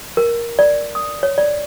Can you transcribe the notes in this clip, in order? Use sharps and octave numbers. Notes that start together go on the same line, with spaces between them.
A#4
D5
D#6
C#5
D5